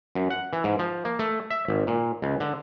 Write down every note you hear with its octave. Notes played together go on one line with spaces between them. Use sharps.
F#2
F#5
E3
G#2
F3
A#3
A3
E5
G#1
A#2
C#2
D3